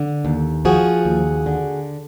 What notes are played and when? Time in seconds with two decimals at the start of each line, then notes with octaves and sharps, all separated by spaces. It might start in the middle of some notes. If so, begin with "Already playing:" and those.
Already playing: D3
0.25 D#2
0.65 F3 F#4 G#4
1.05 D#2
1.46 D3